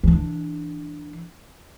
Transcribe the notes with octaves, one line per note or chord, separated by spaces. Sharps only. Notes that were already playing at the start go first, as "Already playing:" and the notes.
E3 D4